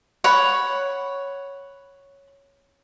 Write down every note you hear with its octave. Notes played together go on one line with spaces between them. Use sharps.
C#5 F#5 B5